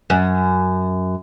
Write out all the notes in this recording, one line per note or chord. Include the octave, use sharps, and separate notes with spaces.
F#2